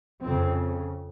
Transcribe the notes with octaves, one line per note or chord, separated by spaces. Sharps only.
F2 C#3 C4